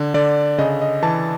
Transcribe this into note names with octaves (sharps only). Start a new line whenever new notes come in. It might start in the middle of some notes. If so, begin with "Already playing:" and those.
Already playing: D3
D3 D5
C#3 D#5
D#5
E3 A5